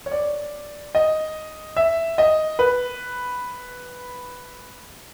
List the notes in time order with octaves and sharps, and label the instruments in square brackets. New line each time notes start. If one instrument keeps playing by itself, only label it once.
[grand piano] C#5
D5
D#5
E5
D#5
B4